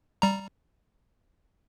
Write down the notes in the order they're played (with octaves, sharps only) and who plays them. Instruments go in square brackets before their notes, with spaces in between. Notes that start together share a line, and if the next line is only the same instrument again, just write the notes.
[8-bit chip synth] G3 A#5